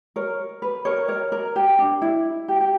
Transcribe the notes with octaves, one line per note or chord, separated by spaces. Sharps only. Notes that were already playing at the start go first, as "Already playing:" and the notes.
A#4 C#5
B4
A#4 C#5
A#4 C#5
A#4
G4
D4
E4
G4
G4